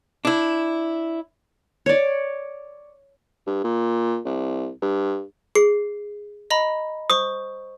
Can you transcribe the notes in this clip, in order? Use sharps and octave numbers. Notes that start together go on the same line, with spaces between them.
D4 E4
C#5 D5
G2
A#2
C2
G2
G#4 C7
D#5 A#5 B5
C5 C#6 D#6